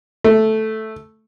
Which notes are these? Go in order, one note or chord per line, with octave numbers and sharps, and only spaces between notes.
A3